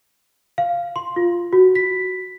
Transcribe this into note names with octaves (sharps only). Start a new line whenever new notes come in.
F5
C6
F4
F#4
B6